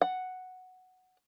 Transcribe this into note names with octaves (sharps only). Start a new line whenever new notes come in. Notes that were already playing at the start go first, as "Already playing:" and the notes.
F#5